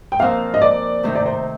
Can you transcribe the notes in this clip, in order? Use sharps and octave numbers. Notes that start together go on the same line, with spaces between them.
G5
A#2 F3 C4 D#4 F5
D#5
D5
C3 D#3 A3 D#4 C5
D5
C5